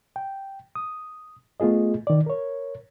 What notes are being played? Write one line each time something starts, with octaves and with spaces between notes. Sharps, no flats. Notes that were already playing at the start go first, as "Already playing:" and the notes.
G5
D#6
A3 B3 F4 G#4 D#5
D#3 D5
A#4 C#5